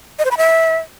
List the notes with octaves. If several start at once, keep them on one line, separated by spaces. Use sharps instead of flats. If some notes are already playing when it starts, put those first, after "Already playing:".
D#5
C5
B5
E5